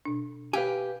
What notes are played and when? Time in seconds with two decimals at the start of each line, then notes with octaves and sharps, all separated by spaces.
0.05 B2 D4
0.53 G4 B4 F5 G#5